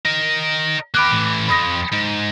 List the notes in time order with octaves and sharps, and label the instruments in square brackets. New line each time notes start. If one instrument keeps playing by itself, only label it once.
[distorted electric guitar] A#4 D#5
[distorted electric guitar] A#3 G4 [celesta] B5 D6 F#6
[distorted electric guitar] A2 E3
[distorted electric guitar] F2 [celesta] B5 D#6 A#6
[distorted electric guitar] G#2